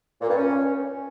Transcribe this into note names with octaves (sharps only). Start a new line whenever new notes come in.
A#2
G2
C#4